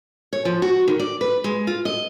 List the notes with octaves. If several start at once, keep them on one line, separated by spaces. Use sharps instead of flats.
C#5
F3
F#4
D#3
D5
B4
G#3
F4
D#5